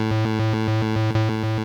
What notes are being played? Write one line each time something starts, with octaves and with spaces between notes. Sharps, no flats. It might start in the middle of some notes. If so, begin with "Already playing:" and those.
Already playing: A2
A2